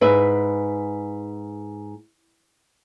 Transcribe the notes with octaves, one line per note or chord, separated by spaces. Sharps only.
G#2 B4 E5